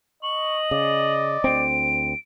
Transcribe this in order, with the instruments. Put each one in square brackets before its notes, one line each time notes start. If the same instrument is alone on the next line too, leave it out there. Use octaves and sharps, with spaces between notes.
[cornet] D#5 [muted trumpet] C#6 [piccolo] F#7
[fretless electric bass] C#3 [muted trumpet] D5
[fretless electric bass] D2 C4 [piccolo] D7